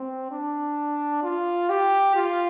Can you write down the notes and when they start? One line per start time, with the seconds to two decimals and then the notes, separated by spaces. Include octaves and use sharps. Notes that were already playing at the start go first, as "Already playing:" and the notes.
Already playing: C4
0.32 D4
1.24 F4
1.70 G4
2.16 F4